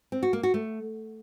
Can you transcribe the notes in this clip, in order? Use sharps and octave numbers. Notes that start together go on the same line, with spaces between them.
C4
F#4
A#3
F#4
A3